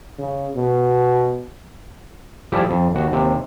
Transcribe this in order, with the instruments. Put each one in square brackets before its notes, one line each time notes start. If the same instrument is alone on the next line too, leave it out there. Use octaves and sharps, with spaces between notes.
[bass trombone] C#3
B2
[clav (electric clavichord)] F3 G3 A3 E4 G4 G#4
F2
D#2 F#4
D#2 C3